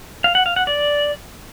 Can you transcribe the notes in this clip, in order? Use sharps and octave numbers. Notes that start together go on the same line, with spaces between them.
F5
F#5
F5
F#5
D5